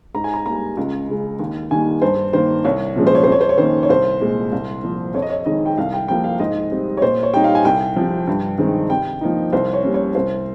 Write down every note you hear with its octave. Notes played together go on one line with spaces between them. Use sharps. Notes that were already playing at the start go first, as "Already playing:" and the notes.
G#2 A#5
G#5
A#5
G3 A#3 A#5
C#2
C#3 G#3
D#2
D#3 G3 A#3 G#5
G2 C5
D#3 A#3 C5
C2 C#5
A#2 F3 G#3 C#4
C5
C#5
C5
F2 C#5
C5
C#5
D#3 A#3 C#4 C5
C#5
C2 C5
A#2 G#3
C2
A#2 F3
F2 C#5
D#5
C#5
D#3 G#3 C4 D#4 D#5
G5
C2 F5
G5
C3 F3 A#3 G5
F5
G#2 D#5
G3 C4
C#5
A#2 C5
C#5
G3 C4 D#4 G5
F5
G#5
C2 G5
C3 F3
G2
D#3 G#3 C4 D#4
C3 G5
F3 A#3 D#4
C2 C5
C#5
C3 G3 A#3 C#4
C#5
C2 C5